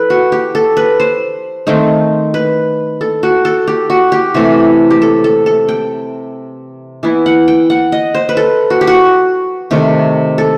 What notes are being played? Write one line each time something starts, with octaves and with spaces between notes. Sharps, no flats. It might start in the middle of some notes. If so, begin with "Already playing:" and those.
Already playing: E3 A4 B4
F#4
G4
A4
B4
C5
D#3 A3 C4 D#4
B4
A4
F#4
A4
G4
F#4
G4
C3 E3 A3
G4
A4
A4
A4
G5
E3 B3 E4
F#5
G5
F#5
D#5
C5
B4
A4
F#4
G4
F#4
C3 D#3 A3
A4